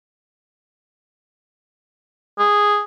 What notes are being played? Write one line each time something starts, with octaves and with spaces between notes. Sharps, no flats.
G#4